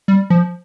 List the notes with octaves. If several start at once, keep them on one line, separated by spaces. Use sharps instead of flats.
G3
F3